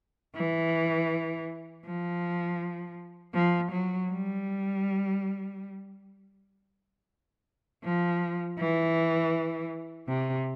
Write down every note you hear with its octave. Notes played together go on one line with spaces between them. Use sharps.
E3
F3
F3
F#3
G3
F3
E3
C3